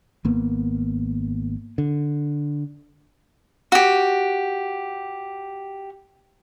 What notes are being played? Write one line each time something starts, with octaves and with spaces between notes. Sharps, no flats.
G#1 A#3 B3
D3
F#4 G4